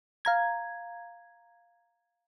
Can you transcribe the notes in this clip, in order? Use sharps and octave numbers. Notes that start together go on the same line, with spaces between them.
F5 A#5 G#6